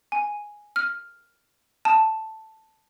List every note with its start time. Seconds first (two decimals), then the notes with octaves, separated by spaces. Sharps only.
0.12 G#5
0.76 F6
1.85 A5